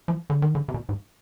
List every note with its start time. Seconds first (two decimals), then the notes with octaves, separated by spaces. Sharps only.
0.08 F3
0.30 D3
0.42 D#3
0.55 D3
0.68 C3
0.74 B2
0.89 G#2